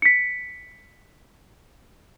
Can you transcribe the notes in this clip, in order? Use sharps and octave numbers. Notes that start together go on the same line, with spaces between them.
B6 C#7